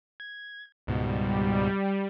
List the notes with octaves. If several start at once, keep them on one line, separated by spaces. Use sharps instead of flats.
G#6
C#2 G#2 B2 G3